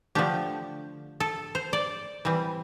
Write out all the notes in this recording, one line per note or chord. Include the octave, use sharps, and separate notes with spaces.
D3 F3 A3 D4 G4
A4
C5
D5
E3 G3 C4